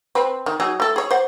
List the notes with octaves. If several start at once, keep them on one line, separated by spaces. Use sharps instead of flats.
C4 B4
D#3
F#3 D#4 G#4
A3 A4
G#4 C#5
C5 F#5